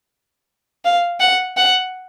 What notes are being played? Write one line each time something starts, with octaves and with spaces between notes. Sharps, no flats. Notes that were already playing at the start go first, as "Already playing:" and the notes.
F5
F#5
F#5